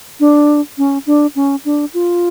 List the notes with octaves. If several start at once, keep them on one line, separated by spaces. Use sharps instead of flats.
D4
C#4
D4
C#4
D4
F4